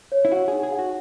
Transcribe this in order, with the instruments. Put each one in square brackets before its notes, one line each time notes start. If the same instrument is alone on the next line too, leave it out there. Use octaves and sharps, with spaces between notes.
[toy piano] C#5
[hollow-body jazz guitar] E4
[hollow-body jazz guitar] F#4 [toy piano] F#5
[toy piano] D#4 [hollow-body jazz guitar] G#4
[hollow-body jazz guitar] G#4
[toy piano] F#5
[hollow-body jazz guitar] F#4